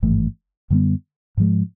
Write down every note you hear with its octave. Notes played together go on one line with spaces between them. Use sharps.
G#1 G2 E3 A3
F#2 D3 G3 B3
G#2 F3 G#3